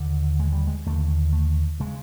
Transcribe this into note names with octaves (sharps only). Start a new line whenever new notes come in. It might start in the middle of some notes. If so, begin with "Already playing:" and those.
Already playing: D#2 D3
G#3
G3
G#3
D#2 D3 A3
A3
C#3 G#3